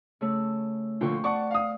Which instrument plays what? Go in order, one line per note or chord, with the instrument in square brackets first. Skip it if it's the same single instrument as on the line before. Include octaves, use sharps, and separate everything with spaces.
[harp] C#3 A3 E6
[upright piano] A#2 D3 F3 [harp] C5 G5 C#6
[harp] D5 [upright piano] F#5 A5 C#6
[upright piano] F5 D#6